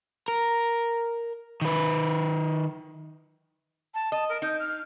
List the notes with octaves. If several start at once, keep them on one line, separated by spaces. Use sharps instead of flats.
A#4
D#3 B4
A5
D#5 A5
A#4
D#4 G6
F6